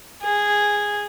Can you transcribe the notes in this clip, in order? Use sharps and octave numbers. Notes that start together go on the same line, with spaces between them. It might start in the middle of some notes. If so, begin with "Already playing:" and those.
G#4